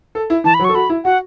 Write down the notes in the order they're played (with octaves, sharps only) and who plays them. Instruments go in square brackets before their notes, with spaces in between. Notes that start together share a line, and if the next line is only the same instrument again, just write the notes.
[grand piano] A4
E4
[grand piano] E3 [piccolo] A5
[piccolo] B5
[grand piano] F#3
[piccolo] C#6
[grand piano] A4
[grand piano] F#4 [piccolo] B5
[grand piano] E4
[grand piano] F#4 [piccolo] F#5